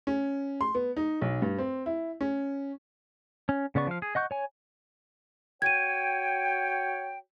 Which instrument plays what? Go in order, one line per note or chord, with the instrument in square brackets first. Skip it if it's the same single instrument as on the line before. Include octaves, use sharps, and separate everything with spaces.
[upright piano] C#4
C6
B3
D#4
B1
G2
C4
E4
C#4
[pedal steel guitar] C#4
C#3 B3 D5 C#6
F3 F5
G#4
D#5 F#5 C#6 G6
C#5 G#5
[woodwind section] F#4 C#5 G5 [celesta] G#6 D#7